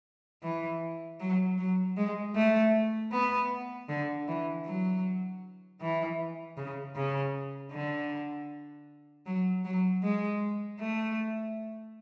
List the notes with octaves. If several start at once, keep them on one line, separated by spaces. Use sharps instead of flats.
E3
F#3
F#3
G#3
A3
B3
D3
E3
F#3
E3
C#3
C#3
D3
F#3
F#3
G#3
A3